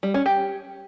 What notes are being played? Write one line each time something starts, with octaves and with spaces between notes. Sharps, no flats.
G3
C#4
G4